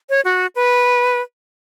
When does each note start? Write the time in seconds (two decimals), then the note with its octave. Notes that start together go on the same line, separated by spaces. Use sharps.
0.10 C#5
0.25 F#4
0.56 B4